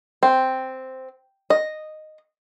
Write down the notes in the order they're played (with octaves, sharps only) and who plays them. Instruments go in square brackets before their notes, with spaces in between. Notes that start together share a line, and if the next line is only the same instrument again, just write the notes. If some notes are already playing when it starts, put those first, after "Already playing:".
[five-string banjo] C4
D#5